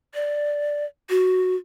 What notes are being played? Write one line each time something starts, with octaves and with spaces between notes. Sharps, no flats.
D5
F#4